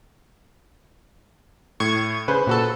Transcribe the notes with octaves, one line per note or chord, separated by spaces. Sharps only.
A2 C#6 G#6
C#3 B4 C5
A#2 F#4 A4